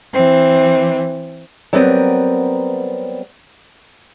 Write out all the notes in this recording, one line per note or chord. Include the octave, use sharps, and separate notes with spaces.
E3 C4
F#3 G3 B3 C4 A#4 B4